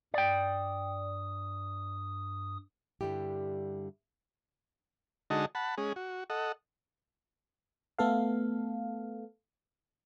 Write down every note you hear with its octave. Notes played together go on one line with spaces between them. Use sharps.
G2 D5 G5 D#6
G2 D3 G3 E4 G4
D3 G#3 D#4 F#4 D#5 A5
F#5 A5 B5
G#3 C#4 G#4
F#4
A4 D#5 F#5
A3 B3 A4 F5